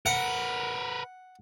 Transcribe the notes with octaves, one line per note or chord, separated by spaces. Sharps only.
A#4 B4 F#5